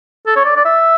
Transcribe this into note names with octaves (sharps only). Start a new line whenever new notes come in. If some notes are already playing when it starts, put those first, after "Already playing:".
A4
C#5
D5
D5
E5